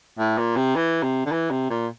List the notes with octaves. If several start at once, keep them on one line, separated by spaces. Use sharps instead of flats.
A2
A#2
C3
E3
C3
D3
E3
C3
A#2